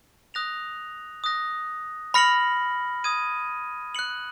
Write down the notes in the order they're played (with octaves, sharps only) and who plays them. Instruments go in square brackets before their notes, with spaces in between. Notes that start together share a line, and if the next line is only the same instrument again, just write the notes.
[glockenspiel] D#6 F#6 A#6 F7
D#6 F#6 A#6
B5 F6 A#6 C#7 F#7
D#6 G#6 D#7
F#6 C#7 F#7